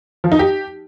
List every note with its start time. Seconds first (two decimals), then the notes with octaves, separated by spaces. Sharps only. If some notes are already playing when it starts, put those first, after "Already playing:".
0.24 F3
0.32 D#4
0.39 G4